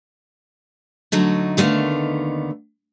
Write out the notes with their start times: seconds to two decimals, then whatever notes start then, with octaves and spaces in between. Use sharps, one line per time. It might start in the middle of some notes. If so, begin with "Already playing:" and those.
1.12 D3 F#3 A3 D#4
1.57 D#2 D3 D#3 A3 B3 F5